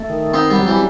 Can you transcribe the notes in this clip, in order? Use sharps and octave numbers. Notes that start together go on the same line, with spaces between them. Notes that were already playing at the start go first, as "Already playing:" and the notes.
Already playing: A3
D#3
B3 C4 D#4
G3 B3
F#3
E3 G3